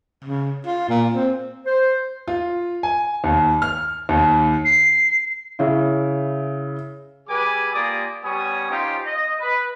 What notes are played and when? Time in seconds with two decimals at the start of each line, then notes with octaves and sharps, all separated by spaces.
0.25 C#3
0.66 F4
0.89 A#2
1.14 C4
1.66 C5
2.28 F4
2.83 G#5
3.24 D#2
3.62 F6
4.09 D#2
4.65 C7
5.59 C#3 E4
7.29 G3 G#4 B4 G#5 D6
7.73 A#3 F4 G4 D5 G#5 D#6
8.24 G3 B3 C#4 C#5 G#5 D#6
8.69 C#4 D#4 F4 G4 C5
9.04 D#5
9.39 B4